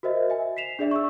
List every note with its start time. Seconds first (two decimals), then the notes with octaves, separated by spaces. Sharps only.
0.03 F#4 A#4 C5 D#5 E5
0.30 E5 G#5
0.57 B6 C7 E7 F7
0.79 D4 G#4 D5 E5
0.91 C#6 E6